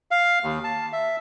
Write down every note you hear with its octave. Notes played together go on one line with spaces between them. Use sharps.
F5
D#2
A5
E5